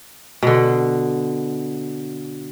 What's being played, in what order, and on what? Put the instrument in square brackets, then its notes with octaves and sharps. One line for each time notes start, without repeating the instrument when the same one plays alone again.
[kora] B2 D3